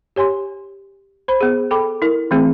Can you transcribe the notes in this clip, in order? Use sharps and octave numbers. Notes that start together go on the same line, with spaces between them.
G4 C#5 G#5 C6
C5 B5
B3 G#4
A4 G5 B5 D6
E4 A#4
E3 A3 C4 G#4